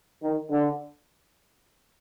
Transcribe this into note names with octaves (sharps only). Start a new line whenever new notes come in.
D#3
D3